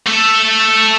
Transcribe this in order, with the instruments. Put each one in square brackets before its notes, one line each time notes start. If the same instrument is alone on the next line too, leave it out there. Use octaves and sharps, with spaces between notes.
[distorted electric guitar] A3 A4